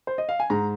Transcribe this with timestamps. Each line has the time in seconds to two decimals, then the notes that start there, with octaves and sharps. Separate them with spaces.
0.07 C5
0.18 D#5
0.29 F5
0.40 G#5
0.50 G#2 A#5